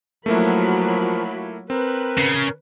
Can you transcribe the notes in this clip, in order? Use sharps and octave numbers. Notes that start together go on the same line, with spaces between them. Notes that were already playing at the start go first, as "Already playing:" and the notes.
F3 F#3 A3 A#3 E4 F4 A#4 B5
C4 A#4 B4
C#3